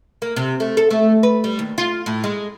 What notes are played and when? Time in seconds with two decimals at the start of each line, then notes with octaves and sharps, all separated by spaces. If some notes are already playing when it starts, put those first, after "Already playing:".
0.22 A#3
0.36 C3
0.60 A3
0.77 A4
0.91 A3
1.23 B4
1.44 G3
1.59 D#2
1.78 F4
2.06 A2
2.24 G#3